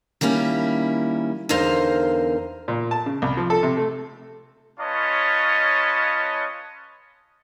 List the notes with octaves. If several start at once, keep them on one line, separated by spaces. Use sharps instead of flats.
D#3 G3 A#3 C#4 E4
E2 D3 D#4 A#4 C5 F5
A#2
A5
C#3
C2
F3
A4
C3
A3
C#4 F4 B4 C#5 D#5 A5